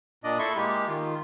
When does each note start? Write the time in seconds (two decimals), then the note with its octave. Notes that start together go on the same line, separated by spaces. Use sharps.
0.24 A#2 D4 D5 D#5
0.39 E4 A4 E5 C6 C#6
0.56 G#3 A#3 G4
0.88 D#3 F4